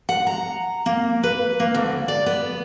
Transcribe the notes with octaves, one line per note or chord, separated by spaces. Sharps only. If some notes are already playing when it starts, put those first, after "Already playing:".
F#5
A#5
A#3
B4
A#3
D2
D5
B3